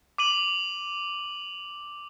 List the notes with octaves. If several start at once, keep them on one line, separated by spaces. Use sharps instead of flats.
D6 D#7 F#7